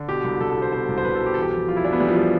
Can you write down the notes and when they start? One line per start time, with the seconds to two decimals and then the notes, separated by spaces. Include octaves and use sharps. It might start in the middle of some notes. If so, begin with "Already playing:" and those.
Already playing: D3
0.08 B2 G4
0.24 C2
0.40 C2 A4
0.51 A4
0.56 B2
0.62 C5
0.72 B2 C5
0.89 C2
0.98 C5
1.04 C2 B4
1.15 A4
1.20 B2
1.26 G4
1.34 A4
1.37 E3 G4
1.53 F2
1.68 F2 F4
1.77 E4
1.84 E3 D4
1.93 B3
2.00 E3 G3
2.09 F3
2.17 G3